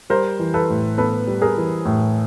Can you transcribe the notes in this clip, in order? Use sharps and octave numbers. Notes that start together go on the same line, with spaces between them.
G3 A#4 C5
E3
A4 B4
A2
B3 A4 B4
G3
G#4 A#4
E3
A2